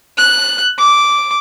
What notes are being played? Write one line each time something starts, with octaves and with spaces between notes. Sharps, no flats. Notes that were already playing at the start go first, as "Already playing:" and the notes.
F#6
D6